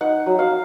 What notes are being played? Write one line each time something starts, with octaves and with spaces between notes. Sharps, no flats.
D#4 F#5
F#3
F5